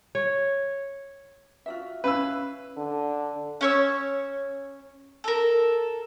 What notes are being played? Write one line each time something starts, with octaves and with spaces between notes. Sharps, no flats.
C#5
F4 F#4 E5
C#4 E4 B4 F5 E6
D3
C#4 C#5 E6
A4 A#4